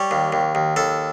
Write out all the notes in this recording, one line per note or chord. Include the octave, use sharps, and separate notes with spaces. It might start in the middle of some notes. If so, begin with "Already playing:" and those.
Already playing: G3 C#5
D#2
D#2
D#2
D#2 A4